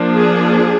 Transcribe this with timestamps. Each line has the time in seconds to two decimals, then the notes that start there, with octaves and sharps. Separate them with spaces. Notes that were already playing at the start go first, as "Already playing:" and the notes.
Already playing: F3 A#3 D4
0.16 G#4